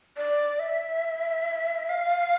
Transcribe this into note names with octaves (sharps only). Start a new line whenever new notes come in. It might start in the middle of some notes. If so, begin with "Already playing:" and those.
D5
E5
F5